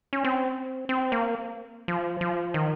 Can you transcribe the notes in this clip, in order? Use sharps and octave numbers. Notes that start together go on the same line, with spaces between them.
C#4
C4
C4
A#3
F3
F3
D#3